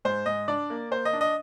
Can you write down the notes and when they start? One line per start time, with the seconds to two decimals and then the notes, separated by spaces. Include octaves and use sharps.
0.05 G#2 C5
0.26 G#2 D#5
0.48 D4 D5
0.70 A#3
0.91 A#3 C5
1.05 D#5
1.13 D4
1.21 D#5